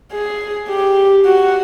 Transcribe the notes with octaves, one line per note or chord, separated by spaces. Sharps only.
G#4
G4
F#4